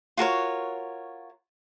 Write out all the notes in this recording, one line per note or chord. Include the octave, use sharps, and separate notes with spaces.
F4 F#4 A#4 C#5